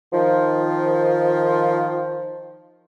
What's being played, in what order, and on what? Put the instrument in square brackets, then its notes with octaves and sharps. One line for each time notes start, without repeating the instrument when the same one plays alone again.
[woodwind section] D#3 F3